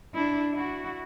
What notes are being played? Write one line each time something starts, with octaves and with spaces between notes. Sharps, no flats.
D4 E4
E4 F#4